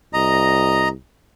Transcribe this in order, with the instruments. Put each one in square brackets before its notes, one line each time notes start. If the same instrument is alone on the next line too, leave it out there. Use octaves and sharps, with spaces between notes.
[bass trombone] C2 [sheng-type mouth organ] D#5 A#5